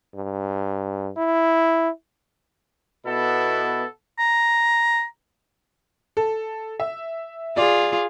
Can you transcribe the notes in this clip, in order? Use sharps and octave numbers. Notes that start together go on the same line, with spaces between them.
G2
E4
B2 B3 E4 A4
A#5
A4
E5
F4 G#4 D5